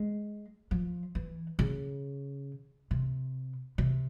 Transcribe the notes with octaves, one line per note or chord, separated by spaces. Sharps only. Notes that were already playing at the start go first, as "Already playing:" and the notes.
Already playing: G#3
F3
E3
C#3
C3
C3